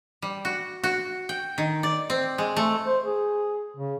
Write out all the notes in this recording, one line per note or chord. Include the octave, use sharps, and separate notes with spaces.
G3
F#4
F#4
G5
D#3
D5
C4
G#3
A3
C5
G#4
C#3